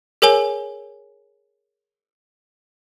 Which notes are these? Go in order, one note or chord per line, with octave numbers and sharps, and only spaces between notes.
G#4 A#4 C#5 G#5 G7